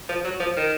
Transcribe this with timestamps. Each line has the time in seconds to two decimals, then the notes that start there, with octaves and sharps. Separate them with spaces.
0.09 F3
0.24 F#3
0.40 F3
0.57 D#3